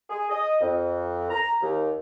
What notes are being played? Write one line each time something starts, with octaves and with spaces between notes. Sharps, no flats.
G#4
D#5
F2
A#5
D#2